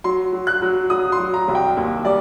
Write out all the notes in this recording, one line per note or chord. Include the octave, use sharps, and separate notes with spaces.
F#3 C6
F#3
F#6
F#3
F#3 D#6
C6
F#3
A#5
C2
G5
D#2
G3 D5